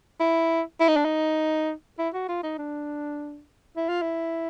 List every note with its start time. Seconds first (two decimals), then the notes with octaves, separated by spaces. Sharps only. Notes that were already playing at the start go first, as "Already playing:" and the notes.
0.20 E4
0.80 E4
0.88 D#4
0.96 D4
1.05 D#4
1.98 E4
2.14 F#4
2.29 F4
2.43 D#4
2.58 D4
3.76 E4
3.89 F4
4.02 E4